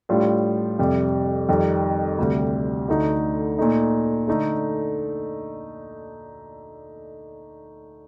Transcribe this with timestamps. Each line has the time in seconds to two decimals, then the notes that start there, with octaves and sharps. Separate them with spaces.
0.09 A2 G3 D4 F4
0.79 F2 C3 G3
1.49 F2 D#3 G3
2.18 D2 C3 G3
2.88 D2 D3 A3 D#4
3.58 A#2 A3 D#4
4.28 D3 A3 D#4